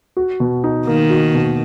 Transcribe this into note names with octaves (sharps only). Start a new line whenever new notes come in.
F#4
B2
D#4
D#3 A#3
F#4
B2